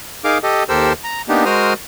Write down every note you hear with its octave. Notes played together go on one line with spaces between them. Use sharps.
D#4 G#4 A#4 F5 D6
G4 A4 D#5
D#2 G4 A4 A#4 C5 E6
A#5
A#3 B3 D4 D#4 G4
G#3 F#4 A#4 C5 D#6 F6